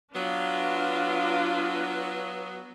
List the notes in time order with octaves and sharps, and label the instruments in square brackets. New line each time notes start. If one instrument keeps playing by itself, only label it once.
[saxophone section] F#3 B3 [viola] D4 F4